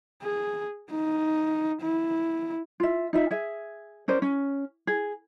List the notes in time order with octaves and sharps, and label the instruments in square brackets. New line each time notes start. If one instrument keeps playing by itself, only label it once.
[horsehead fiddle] G#4
D#4
E4
[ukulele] F4 E5
D#4 F4 E5
G#4 E5
C#4 A#4 C5 D5
C#4
G#4